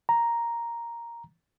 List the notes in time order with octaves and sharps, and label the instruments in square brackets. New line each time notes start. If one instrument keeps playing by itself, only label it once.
[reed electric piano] A#5